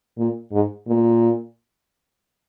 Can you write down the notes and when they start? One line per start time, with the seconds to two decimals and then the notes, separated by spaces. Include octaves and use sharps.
0.17 A#2
0.52 G#2
0.87 A#2